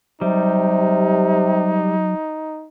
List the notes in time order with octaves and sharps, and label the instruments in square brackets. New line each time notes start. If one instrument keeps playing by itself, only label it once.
[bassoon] C3 [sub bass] F#3 [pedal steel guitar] G3 [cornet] D#4